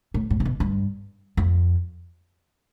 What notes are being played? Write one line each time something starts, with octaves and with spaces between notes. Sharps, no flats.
A2
A2
C3
B2
G2
F2